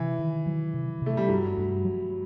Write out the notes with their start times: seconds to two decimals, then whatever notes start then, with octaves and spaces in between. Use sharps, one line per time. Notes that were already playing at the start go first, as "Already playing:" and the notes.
Already playing: C3 E3
0.19 D#3
0.46 F#3
0.74 C3
1.02 C3 A3
1.17 G3
1.29 G2 F#3
1.57 G2
1.84 F#3